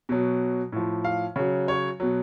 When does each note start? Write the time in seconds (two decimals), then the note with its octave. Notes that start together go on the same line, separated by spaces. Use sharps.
0.09 B2 F#3
0.72 A2 F3
1.05 F5
1.36 C#3 F#3
1.68 C#5
2.00 B2 F#3